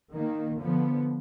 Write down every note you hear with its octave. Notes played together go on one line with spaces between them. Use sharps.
D#3 A#3
D3 F3 B3